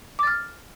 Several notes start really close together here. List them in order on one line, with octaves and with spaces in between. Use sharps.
D6 A6 F6